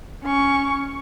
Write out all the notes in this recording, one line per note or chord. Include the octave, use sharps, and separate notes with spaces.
C#4 C#6